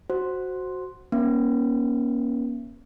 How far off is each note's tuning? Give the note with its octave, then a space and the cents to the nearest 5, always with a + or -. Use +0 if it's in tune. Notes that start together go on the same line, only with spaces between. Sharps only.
F#4 +0 C5 +0
A#3 +40 C#4 +0